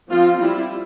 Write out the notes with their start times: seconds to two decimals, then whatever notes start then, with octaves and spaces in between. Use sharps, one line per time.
0.11 F3 C4 F4
0.40 G3 C4 E4